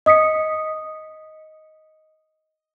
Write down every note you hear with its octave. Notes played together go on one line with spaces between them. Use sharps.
D#5 D#6 B6 C#7